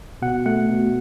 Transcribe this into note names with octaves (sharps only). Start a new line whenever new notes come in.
B2 F#5
A3 F#5
B2